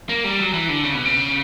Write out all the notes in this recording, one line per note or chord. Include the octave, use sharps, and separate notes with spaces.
A#3
G3
F#3
E3
D3
C#3
B2
C#3